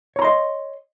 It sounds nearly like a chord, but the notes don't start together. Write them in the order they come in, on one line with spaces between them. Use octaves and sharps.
C#5 A#5 C6 D#5